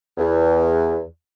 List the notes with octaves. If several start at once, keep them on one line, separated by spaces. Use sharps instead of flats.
E2